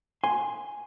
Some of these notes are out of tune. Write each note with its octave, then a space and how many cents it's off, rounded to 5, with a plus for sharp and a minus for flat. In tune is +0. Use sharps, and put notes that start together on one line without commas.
G#5 +0 C6 +5